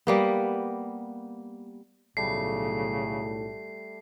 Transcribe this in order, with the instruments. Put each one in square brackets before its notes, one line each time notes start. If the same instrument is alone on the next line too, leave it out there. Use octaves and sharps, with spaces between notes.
[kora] G3 A#3 B3
[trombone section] B1 A2 [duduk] C#3 [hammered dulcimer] G3 A3 [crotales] C7